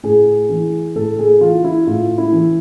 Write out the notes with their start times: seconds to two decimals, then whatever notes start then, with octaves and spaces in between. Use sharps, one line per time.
0.03 A2 G#4
0.49 E3
0.95 A2 A4
1.19 G#4
1.40 E3 F4
1.64 E4
1.87 A2 F4
2.18 E4
2.32 E3